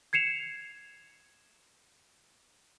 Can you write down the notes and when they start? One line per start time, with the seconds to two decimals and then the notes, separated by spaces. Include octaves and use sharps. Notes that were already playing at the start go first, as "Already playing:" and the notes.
0.13 G#6 C7 C#7 E7 F7